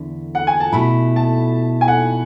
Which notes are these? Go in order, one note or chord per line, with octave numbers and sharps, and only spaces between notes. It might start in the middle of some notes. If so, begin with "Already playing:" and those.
Already playing: E2 D3 A3 E4
F#5
G#5
A5
B2 A3 E4 B5
A5
G#5
F#5